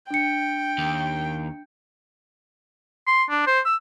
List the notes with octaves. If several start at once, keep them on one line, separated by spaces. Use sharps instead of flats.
D4 G5 C#7
D#2
C6
D4
C5
E6